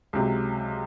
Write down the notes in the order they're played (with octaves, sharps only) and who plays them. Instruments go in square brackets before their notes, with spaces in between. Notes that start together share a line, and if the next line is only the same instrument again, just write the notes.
[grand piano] C#2 C3 F#3